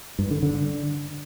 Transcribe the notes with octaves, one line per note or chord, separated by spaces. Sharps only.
G2
D3
D3